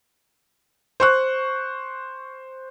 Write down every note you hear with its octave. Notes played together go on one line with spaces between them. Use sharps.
C5 C#6 F#6